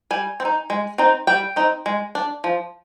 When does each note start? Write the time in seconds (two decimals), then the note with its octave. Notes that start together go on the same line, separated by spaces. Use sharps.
0.11 G3 G#5
0.40 C4
0.45 D#4
0.70 G#3
0.98 C4 D#4
1.27 G3 G5
1.56 C4 D#4
1.86 G#3
2.15 D4
2.44 F3